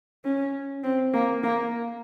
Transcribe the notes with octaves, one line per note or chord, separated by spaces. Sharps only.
C#4
C4
A#3
A#3